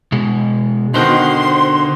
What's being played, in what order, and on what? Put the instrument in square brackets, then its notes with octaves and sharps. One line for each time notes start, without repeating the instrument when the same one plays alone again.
[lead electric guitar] B2 G#3
[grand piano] B2 D#3 F#4 [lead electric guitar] D3 C5 [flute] C6